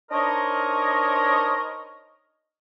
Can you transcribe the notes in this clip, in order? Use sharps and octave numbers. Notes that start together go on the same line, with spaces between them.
D4 D#4 A#4 C5 C#5 D#5